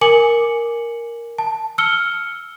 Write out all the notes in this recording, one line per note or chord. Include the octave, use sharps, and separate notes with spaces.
A#4 G#5 D6 C#7 F#7
A5
E6 F6 C#7 G7